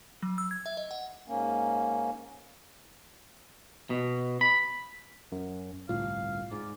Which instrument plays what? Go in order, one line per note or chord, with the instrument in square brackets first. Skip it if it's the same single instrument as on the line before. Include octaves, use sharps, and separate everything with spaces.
[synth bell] F#3
E6
G#6
E5
D#5
F#5
[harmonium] G#2 A#3 C#4
[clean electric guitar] B2
B5
[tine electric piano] F#2
[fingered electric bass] G1 C2 [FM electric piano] A2 F4 [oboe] F5
[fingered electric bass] G#2 [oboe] D5